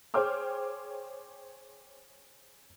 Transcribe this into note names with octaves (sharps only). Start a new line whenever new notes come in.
G#4 C5 C#5 G5 D6 F6